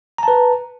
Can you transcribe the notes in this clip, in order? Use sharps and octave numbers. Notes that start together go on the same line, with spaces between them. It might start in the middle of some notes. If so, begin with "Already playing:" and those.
B4 A5 A#5